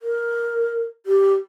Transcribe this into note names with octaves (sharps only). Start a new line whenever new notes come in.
A#4
G4